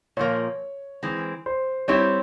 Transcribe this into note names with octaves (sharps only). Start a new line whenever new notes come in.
A#2 F3 A#3 C#5
E3 G#3 C4
C5
G3 C4 E4 G4 C#5